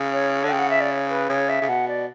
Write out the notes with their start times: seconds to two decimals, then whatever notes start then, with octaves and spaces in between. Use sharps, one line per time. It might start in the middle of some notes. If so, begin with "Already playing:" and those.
Already playing: C#3
0.13 C#5
0.44 D3
0.49 C#3 G5
0.59 F#5
0.70 E5
0.81 D5
0.91 C#5
1.10 B4
1.29 C#3 C#5
1.49 E5
1.62 C#3
1.68 B2 F#5
1.88 D5